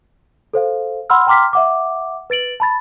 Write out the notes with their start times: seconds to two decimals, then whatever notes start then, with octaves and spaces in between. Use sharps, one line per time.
0.53 A4 C5 F5
1.10 F#5 B5 C6 E6 F6
1.27 G5 A#5 C6 D6 F6 B6
1.53 E5 F#5 D6
2.30 B4 A6 D7 F#7
2.60 A5 B5 A6